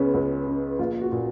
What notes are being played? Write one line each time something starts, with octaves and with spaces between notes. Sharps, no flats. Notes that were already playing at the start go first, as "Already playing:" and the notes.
Already playing: C#2 C#3 B3 C#4
C#2
C#3
A#1 F4
F#4
A#2